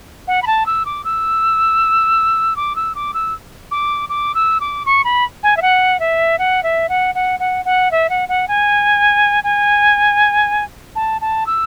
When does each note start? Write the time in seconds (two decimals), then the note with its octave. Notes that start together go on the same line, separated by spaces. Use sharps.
0.27 F#5
0.42 B5
0.47 A5
0.66 E6
0.85 D6
1.04 E6
2.56 D6
2.76 E6
2.95 D6
3.14 E6
3.71 D6
4.09 D6
4.35 E6
4.60 D6
4.86 C#6
5.04 B5
5.43 G#5
5.57 E5
5.62 F#5
6.00 E5
6.38 F#5
6.63 E5
6.89 F#5
7.15 F#5
7.39 F#5
7.65 F#5
7.91 E5
8.09 F#5
8.28 F#5
8.48 G#5
9.44 G#5
10.95 A5
11.21 A5
11.46 E6